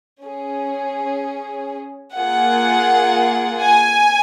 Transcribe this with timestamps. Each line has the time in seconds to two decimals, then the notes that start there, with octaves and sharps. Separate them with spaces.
0.22 C#4
0.28 G#4
2.16 A#3 F4 G#4 F#5
3.63 G#5